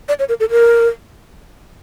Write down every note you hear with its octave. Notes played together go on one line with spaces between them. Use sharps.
D5
C#5
A#4
A4
A#4